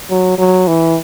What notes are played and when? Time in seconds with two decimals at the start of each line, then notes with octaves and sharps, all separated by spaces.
0.10 F#3
0.38 F#3
0.68 E3